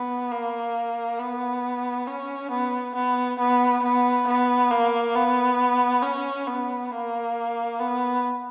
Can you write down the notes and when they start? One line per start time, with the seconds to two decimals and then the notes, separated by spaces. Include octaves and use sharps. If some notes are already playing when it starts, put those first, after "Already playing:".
Already playing: B3
0.31 A#3
1.19 B3
2.07 C#4
2.51 B3
2.95 B3
3.39 B3
3.83 B3
4.27 B3
4.71 A#3
5.15 B3
6.03 C#4
6.47 B3
6.91 A#3
7.79 B3